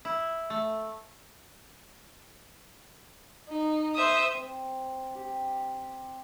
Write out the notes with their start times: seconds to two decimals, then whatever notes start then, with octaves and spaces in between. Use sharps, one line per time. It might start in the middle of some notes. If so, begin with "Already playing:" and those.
0.05 E4
0.50 A3
3.49 D#4
3.94 C5 E5 D#6
4.34 C4
5.15 G4